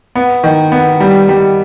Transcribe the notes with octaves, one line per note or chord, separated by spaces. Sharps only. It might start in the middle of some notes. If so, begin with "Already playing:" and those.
B3
D#3
B3
G3
G3